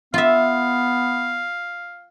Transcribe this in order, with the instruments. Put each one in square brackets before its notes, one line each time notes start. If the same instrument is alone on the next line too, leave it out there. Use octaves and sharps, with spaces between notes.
[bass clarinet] B3 [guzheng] F4 E5 [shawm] F5